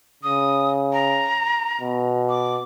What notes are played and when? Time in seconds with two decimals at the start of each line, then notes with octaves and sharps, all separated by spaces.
0.23 C#3 D#6
0.93 A#5
1.81 B2
2.29 D6